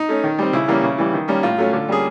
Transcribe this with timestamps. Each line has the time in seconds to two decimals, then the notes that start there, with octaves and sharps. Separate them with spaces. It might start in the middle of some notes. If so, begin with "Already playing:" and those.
Already playing: D#4
0.09 A3 C#4
0.24 D#3
0.38 G3 C4
0.53 C#3 E4
0.68 E3 G3 A#3 C#4
0.83 C#3
0.98 E3 G3
1.13 D#3
1.28 G3 A#3 C#4
1.43 A2 F4
1.58 F#3 A3 C#4
1.73 D3
1.88 G3 A#3 C#4 G#4